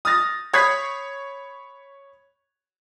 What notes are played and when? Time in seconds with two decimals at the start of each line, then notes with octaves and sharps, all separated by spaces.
0.05 D#6 F6 A6 A#6
0.53 C#5 B5 D#6 G#6 B6 C7